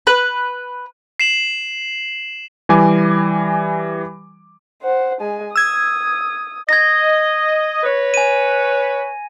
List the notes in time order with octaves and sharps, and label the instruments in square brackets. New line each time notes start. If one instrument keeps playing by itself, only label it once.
[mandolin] B4
[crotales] C7 E7 F#7
[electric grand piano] E3 G3 G#5 D6
[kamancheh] C5 F#5
G#3 G#5
[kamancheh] D#6 [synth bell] E6 G#6
[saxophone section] D#5 [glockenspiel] G#6 A#6
[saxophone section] B4 C#5
[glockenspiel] G#5 D#7